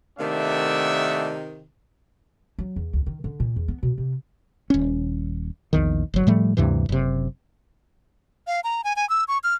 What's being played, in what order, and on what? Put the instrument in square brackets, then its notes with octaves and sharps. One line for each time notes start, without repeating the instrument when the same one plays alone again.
[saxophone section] C3 D#3 [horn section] A3 A#3 D4 [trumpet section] E5 F#5
[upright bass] F#3
E2
D2
D#3
D3
A#2
E2
B3
B2
C3
[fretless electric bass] D#1 C#4
A#1 E2 D#3
G1 F#3
A2 F3 G3 A3
D2 G2 C3 E3
F#1 C3
[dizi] F5
A#5
G#5
G#5
E6
C#6
F6